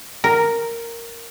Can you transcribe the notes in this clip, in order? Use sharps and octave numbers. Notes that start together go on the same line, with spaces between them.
A#4